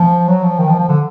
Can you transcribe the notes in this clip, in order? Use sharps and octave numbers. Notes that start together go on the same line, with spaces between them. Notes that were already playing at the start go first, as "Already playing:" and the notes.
Already playing: F3
F#3
F3
D#3
F3
F3
D3